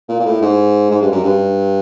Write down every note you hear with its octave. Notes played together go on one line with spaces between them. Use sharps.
A#2
A#2
A2
G#2
G#2
G2
F#2
G2